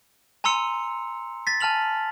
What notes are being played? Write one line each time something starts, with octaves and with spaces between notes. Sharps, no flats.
G#5 A#5 C6 E6 C#7 F7
A6 B6
G#5 A5 F6 F7 F#7